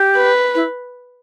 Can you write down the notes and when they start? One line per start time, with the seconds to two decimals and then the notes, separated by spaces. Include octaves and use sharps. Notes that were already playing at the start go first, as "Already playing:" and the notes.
Already playing: G4
0.16 B4
0.55 E4